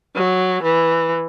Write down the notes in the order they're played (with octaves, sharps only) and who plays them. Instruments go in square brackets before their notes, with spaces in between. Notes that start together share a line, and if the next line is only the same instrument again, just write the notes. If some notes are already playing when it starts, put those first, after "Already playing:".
[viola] F#3
E3